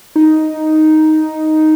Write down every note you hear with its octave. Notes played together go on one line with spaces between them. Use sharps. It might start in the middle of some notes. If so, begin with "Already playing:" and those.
D#4